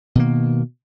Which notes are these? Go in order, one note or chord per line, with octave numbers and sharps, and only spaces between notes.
B2 D#3 A#3